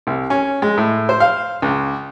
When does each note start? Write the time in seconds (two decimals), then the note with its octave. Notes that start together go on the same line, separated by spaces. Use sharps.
0.07 C2
0.30 C#4
0.62 G#3
0.77 A2
1.09 C5
1.20 F5
1.62 C#2